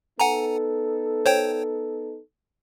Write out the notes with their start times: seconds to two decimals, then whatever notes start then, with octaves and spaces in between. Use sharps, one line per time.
0.20 B3 D#4 A4 F#5 G#5 A#5
1.26 C5 C#5 G5